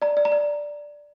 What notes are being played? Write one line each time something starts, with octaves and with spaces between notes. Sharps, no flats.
D5 A#5
D5
A#5
D5